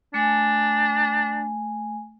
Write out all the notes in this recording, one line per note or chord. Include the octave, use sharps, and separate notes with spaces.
A3 D4 G#5